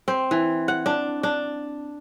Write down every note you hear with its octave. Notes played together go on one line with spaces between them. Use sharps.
C4
E3
F#5
D4
D4